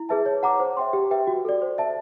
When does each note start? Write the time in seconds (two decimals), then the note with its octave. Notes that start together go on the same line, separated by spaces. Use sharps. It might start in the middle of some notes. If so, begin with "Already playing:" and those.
Already playing: E4
0.09 G#4 B4 E5 A5
0.26 C#5
0.43 F#5 A#5 D6
0.60 C5
0.77 E5 G5 C6
0.93 G4
1.11 B4 E5 G5
1.27 F#4
1.45 A4 D5
1.62 C5
1.78 E5 A5